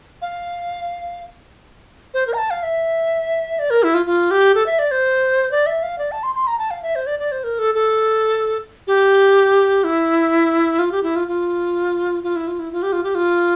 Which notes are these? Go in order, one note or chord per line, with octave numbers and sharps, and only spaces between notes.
F5
C5
A#4
A#5
A5
F5
E5
D5
A#4
E4
F4
F4
G4
A4
E5
D5
C5
D5
E5
F5
D5
A5
C6
C6
A#5
A5
F5
E5
C5
D5
D5
C5
A#4
A4
A4
G4
E4
F4
G4
E4
F4
F4
F4
E4
F4
E4
F4
G4
F4
G4
F4